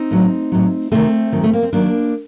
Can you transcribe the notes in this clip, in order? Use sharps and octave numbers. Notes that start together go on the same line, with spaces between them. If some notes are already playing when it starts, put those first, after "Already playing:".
Already playing: C4 D#4
A2 F#3
A2 F#3
D2 C3 D#3 A3 C4
F#2 D#3 F#3
A3
A#3
C4
D#2 D#3 F#3 A#3 D4